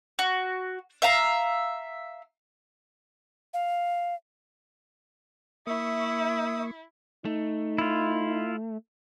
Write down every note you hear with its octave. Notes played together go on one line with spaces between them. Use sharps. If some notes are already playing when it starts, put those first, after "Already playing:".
F#4
E5 F5 A#5
F5
A#3 E4 E5 C#6 D#6
A3 D#4
E4 F4